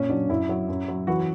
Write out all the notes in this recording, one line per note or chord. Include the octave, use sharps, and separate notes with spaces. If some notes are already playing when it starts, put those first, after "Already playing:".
Already playing: F#2 A#2 C#4
F#3 D4
F#2 E4
F#3
F#2
F#3
E3 F#4